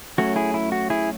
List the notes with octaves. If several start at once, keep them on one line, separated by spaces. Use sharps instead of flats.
F#3 A3 C#4 F#4
E4 G#4
E4
F#4
E4 G#4